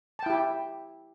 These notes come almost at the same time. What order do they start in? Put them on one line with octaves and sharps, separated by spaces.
A5 G5 E4 G4